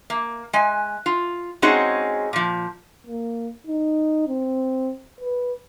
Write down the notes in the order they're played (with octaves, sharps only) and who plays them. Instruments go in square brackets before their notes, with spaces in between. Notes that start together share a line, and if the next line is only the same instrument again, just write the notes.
[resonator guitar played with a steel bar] A#3
G#3 G#5
F4
G#3 C4 C#4 D#4 F#4 G#4
A#2 F3
[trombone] A#3
D#4
C4
B4